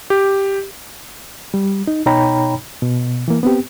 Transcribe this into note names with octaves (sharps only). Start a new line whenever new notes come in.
G4
G3
D#4
B2 D#4 C#5 G5 A#5 B5
B2
E3 A#3
B3 C4 G4